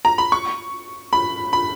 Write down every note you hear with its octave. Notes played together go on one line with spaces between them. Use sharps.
A#5
B5
C#6
B5
B5